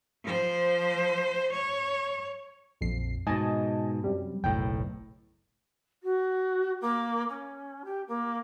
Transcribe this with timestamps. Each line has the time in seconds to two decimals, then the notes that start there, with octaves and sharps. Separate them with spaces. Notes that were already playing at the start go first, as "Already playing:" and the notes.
0.23 F3 C5
1.53 C#5
2.81 A#1 F2 C7
3.27 G#2 B2 D#5 G#5 A5
4.04 F#2 C3 G3
4.44 F#1 B1 A2 G5
6.03 F#4
6.81 A#3
7.29 C#4
7.85 G4
8.08 A#3